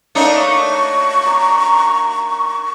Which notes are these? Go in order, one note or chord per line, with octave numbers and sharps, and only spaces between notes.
A3 A#3 D4 D#4 C#5
C#6
D5 A#5